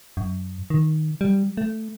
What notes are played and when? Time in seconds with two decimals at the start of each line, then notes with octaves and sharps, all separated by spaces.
0.17 F#2
0.70 D#3
1.21 G3
1.57 A3